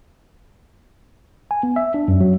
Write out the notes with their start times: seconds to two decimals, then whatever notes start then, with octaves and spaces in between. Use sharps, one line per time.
1.51 G#5
1.63 B3
1.76 E5
1.94 D4
2.08 F#2
2.21 F#3